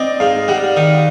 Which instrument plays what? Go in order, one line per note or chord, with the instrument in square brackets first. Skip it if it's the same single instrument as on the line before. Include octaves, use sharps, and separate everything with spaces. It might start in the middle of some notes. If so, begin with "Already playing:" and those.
Already playing: [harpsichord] C4 [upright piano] D5 D#5
[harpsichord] G#2 [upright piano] F5
[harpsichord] G3 [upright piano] F#5
[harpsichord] D#3